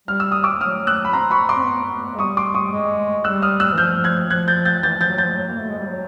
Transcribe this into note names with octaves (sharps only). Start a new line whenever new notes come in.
G3 F6
E6
D#6
D6 E6
F#3 D#6 F6
E6 F#6
B5
C4 A#5 C6
B5 C#6
C6 D6
C4
B3
G#3
G3 C#6 D#6
C6 D6
C#6 D#6
G#3
G3 E6 F#6
D#6 F6
E6 F#6
E3
F3 F6 G6
F#6 G#6
F3 F#6 G#6
G6 A6
G6 A6
E3 G6 A6
F3 G6 A6
F#3
F3 G6 A6
F#3
A#3
A3
G#3
G3
F#3